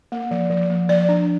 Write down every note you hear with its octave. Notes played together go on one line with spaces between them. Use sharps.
A#3
F3
F3
A#3
F3 D5
D4